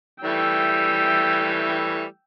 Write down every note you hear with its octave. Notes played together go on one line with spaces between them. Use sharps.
E3 G3 A3 G5 E6